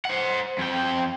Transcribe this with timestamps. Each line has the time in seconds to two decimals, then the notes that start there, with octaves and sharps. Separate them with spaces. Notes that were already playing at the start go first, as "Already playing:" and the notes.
0.05 C5 F#5
0.58 F2 G5